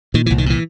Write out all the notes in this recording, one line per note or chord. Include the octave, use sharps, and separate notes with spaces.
A#2 D#3
C2 E3
D#3
A#2 E3